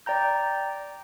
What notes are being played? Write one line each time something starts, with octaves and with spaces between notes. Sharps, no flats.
D5 G5 A#5 G6